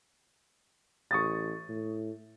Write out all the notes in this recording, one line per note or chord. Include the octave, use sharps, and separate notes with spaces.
A1 C#6 D#6 A6
A2